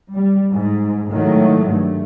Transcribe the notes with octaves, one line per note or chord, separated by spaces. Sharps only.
G3
G#2
A2 D#3 F#3 G#3 A3
G2 A3